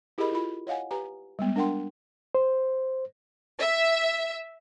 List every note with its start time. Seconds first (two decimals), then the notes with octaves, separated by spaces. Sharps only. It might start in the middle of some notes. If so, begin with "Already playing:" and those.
0.18 E4 G4 G#4 A#4 D#5 B5
0.32 E4 F4 B5
0.67 C#5 D#5 F5 F#5 G#5
0.91 G4 B4 G#5 A#5
1.39 G3 G#3 B3
1.56 D4 A#4 F#5 G5 C6
2.35 C5
3.61 E5